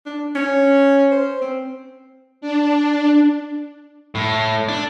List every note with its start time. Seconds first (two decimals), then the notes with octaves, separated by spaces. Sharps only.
0.06 D4
0.35 C#4
1.12 C5
1.42 C4
2.41 D4
4.15 A2
4.69 D4